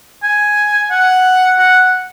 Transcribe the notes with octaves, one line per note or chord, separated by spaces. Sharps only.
G#5
F#5
F#5